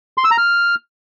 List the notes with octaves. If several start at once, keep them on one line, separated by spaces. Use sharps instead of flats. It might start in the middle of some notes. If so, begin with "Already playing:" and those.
C6
E6
A#5
F6